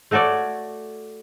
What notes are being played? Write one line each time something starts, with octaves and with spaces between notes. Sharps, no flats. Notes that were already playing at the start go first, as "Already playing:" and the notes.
A3 F#4 A4 C#5 D5